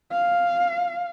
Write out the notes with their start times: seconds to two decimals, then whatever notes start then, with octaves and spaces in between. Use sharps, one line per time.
0.12 F5